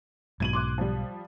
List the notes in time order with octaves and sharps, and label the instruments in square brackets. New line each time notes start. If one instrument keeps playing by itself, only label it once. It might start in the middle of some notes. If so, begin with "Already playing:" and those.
[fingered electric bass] B1 G#2 B2 [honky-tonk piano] G#6 D#7 F#7
[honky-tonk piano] C6 D6 F#6
F3 G3